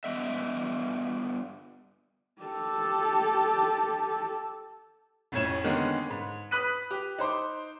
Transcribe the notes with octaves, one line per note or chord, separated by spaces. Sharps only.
G2 B3 D#5 E5
G4 A4
F1 F2 A2 C#4 G#6 E7
D3 D#3 G#3 A#3 B3 C#4
G#2
B4 B5 D#6 F#6 B6 D#7
G4
D#4 C5 C6 D6